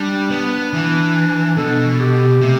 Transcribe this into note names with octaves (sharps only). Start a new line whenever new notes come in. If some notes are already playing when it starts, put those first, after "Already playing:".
Already playing: G3 D4
B3
E3
B2 A4
G4
C3 A3